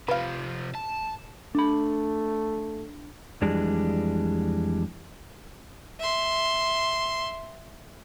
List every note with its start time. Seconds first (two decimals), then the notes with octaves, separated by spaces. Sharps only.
0.08 C3 F3 B4 F5
0.75 A5
1.55 A3 D4 B5
3.42 F2 E3 G3 G#3 D4
5.99 E5 C6